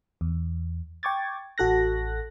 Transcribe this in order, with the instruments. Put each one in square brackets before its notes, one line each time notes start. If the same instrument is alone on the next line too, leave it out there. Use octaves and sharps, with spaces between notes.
[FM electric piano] E2
G5 C#6 D6 G#6 A6
A1 F#4 A4 F#6 A#6